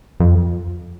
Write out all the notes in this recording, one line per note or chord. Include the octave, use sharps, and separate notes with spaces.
F2